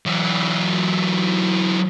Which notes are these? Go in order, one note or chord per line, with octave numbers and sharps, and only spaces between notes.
E3 F#3